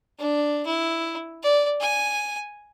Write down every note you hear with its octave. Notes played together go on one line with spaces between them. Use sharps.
D4
E4
D5
G#5